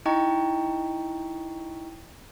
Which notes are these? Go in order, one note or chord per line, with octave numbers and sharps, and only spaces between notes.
D#4 E4 D#5 G5 A#5 C#6